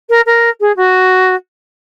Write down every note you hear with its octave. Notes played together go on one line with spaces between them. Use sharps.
A#4
A#4
G#4
F#4